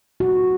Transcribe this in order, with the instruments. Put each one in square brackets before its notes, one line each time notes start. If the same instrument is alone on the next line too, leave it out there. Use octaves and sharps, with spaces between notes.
[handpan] F#4